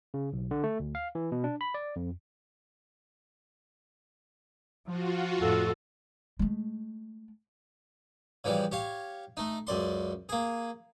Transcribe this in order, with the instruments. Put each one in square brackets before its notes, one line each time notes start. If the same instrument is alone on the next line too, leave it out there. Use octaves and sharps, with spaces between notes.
[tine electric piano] C#3
B1
D3
A3
D2
F5
E3
B2
D4
B5
D5
F2
[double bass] F3 [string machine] F4 F#4
[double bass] F2 A2 [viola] A4
[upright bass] G#3 A3
[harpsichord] C#3 E3 F3 G3
G4 C#5 F5
A3 D#4
C#2 F#2 D5 C6
A#3 G#4